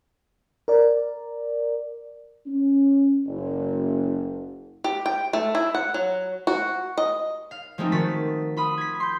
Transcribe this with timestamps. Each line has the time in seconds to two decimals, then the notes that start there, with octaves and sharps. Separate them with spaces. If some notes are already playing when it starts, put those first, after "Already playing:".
0.68 A#4 D5
2.46 C#4
3.26 F#1
4.84 G4
5.06 G5
5.33 A3
5.55 E4
5.75 F#5
5.94 F#3
6.47 F#4
6.98 D#5
7.51 F5
7.78 F3 G#3 A3 C4 D#4 F4
7.92 D#3 F#4 A6 B6
8.57 F4 B5 D#6
8.78 G#6 B6
9.00 C6 G6